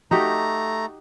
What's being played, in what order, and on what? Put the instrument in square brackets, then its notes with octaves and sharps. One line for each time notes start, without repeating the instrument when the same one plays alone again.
[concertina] A3 A#5 [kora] D#4 F#4 G4